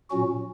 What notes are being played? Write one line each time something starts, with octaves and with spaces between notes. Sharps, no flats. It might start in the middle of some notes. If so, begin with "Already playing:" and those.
A#2 F#3 C#4 F#4